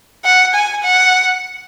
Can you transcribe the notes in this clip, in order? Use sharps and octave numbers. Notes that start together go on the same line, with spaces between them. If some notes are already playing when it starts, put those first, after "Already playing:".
F#5
G#5
F#5